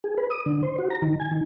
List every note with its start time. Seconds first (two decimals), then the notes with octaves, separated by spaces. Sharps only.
0.04 G#4
0.18 B4
0.30 D#6
0.46 D3
0.63 C5
0.78 F#4
0.90 A#5
1.02 D#3
1.20 G#5
1.31 D#3